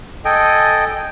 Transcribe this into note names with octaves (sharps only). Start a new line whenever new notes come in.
A4 D#5 G5 G#5